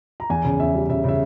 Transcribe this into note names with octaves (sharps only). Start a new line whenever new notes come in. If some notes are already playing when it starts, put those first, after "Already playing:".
A#5
E2 G#5
C#3
E2 E5
G3
C#3 E5
C#3 E5